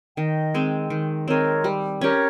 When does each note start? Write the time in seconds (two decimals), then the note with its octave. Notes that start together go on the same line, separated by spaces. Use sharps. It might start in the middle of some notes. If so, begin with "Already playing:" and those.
0.17 D#3 D#5 G5
0.54 G#3 C4
0.90 D#3
1.27 G#3 C4 A#4 C#5
1.64 G3
2.01 C#4 G4 A#4 C#5